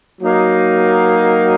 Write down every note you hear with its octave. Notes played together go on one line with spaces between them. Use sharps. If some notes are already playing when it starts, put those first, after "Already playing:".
F#3 A#3 D#4